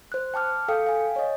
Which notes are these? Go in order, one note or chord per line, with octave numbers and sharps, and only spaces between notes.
C5 F#6
G5 A5 D6 F6
A4 F5 G5
F5 G#5
C#5 D#5